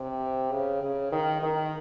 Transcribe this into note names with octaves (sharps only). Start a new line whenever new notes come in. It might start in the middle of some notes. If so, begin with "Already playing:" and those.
Already playing: C3
C#3
C#3
D#3
D#3